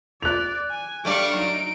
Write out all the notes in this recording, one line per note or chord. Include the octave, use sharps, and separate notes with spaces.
D5 F#6 F7
G#5
G3 A3 D4 D5 F5 C#6 D6
F#3 D#4 D7